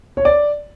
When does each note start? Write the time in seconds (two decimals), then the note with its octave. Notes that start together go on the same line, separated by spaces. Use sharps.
0.17 C#5
0.25 D5